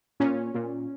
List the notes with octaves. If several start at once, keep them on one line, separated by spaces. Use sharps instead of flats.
A#2 C#4
A#2